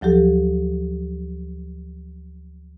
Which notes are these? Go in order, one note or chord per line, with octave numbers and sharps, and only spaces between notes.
D2 F3 F#3 G4 A4